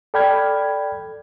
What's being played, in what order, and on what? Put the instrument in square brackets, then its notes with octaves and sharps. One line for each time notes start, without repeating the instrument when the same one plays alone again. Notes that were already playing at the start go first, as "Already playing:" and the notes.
[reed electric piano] A4 D5 G5 B5 F6 G#6